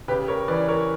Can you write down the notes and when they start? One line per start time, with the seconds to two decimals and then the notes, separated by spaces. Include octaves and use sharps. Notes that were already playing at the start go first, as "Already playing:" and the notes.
0.08 C#3 G4 B4
0.28 A#4 C#5
0.48 E3 B4 D5
0.68 A#4 C#5